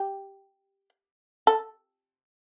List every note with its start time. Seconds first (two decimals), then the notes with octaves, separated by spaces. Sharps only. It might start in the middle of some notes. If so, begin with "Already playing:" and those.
Already playing: G4
1.47 A4